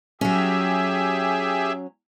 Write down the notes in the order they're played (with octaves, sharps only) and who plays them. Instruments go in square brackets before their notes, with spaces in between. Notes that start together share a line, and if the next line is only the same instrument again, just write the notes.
[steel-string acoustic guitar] F#3 C#4 [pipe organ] G4 G#4 E5